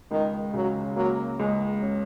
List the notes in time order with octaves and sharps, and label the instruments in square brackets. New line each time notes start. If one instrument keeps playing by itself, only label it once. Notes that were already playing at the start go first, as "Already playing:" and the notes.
[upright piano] C#2 [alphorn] D#3
[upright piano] C#3 [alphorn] F#3
[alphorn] F#3 [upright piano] A#3
[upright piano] C#2 [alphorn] G#3
[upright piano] C#4